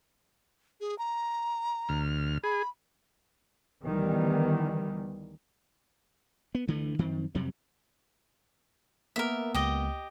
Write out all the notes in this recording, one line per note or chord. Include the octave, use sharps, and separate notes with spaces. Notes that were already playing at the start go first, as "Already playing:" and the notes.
G#4
A#5
D2 F6
G#4 B5
D2 D#3 E3 G3 B3
B3
D2 D3 E3 A3
F#2 D#3 F3 C4
F2 C3 F#3 G3
A#3 B3 A#4 E5
C#2 G4 D#5